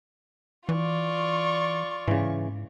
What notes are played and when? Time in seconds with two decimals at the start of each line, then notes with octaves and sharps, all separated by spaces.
0.69 E3 F4 D5 C#6
2.08 G#2 C#3 E3